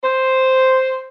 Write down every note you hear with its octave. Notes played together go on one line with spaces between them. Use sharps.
C5